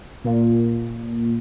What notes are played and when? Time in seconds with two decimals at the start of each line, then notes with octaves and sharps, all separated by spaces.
0.24 A#2